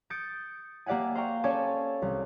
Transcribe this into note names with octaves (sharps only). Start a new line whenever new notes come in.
D#6 G6 A6 C#7 D7
A#3 G4 D5 E5 F#5 G#5
C5 F5 G5 A#5 C#6
C#4 A4 C#5 D5 G#5 A5
C2